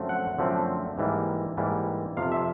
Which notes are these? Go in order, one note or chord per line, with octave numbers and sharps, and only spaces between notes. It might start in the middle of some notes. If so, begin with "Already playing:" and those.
Already playing: F#2 D3 F3 A3 C4
F#5
F#2 D3 F3 A3 C4
G#2 E3 G3 A#3
G#2 E3 G3 A#3
F2 C3 F3 F5
E5